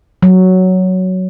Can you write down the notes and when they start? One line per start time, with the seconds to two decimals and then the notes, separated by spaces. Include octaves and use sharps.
0.23 F#3